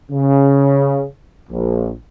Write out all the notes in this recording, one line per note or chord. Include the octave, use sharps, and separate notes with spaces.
C#3
A#1